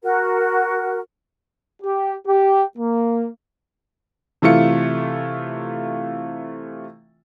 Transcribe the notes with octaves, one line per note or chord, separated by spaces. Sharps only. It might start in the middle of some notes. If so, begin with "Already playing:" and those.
F#4 A#4
G4
G4
A#3
C3 E3 A3 F4 C#7